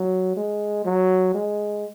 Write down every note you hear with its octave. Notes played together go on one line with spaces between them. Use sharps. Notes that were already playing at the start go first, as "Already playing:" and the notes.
Already playing: F#3
G#3
F#3
G#3